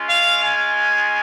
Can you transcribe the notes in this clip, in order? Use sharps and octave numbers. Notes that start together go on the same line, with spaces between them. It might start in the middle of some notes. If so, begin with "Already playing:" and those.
Already playing: G#3 C#4 F4
F5
G#5